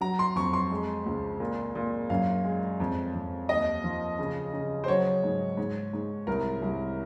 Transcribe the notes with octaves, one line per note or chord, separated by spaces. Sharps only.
F#3 A#5
C6
F2 C#6
C6
G#3
C#2
A#2
A#2
F#2 F5
G#3
F2
F2
D#2 D#5
F3
C#3
C#3
C5
F#3 C#5
G#2
G#2
G#2
C2 A#4
C2